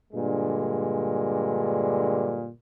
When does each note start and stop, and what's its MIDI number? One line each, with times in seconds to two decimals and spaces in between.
0.14 2.48 43
0.14 2.48 46
0.14 2.48 50
0.14 2.48 56